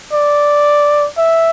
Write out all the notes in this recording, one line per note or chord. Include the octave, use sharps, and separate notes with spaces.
D5
E5